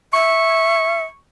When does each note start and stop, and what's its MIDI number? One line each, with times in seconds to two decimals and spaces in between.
0.13 1.04 76
0.13 1.12 85